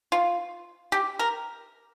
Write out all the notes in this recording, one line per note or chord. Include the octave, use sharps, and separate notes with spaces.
F4
G4
A#4